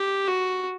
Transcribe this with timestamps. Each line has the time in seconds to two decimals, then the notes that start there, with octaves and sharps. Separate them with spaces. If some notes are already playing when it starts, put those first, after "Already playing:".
Already playing: G4
0.27 F#4